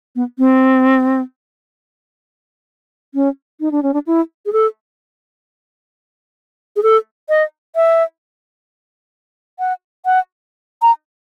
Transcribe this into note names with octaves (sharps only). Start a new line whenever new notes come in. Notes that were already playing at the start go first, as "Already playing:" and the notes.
B3
C4
C#4
D#4
D4
C#4
D4
E4
G#4
A4
G#4
A4
D#5
E5
F#5
F#5
A#5